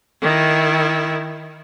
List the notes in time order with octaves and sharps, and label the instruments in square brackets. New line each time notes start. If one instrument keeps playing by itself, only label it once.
[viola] D#3 E4